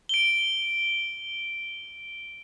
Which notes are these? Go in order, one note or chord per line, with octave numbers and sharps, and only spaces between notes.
D7 G7